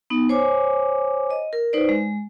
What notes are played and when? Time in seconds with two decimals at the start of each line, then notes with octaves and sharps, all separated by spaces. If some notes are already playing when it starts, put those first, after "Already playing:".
0.10 B3 D#4
0.29 C5 C#5 G#5 D6
1.31 D#5
1.53 A#4
1.73 D#4 B4 C5 D5
1.89 G#3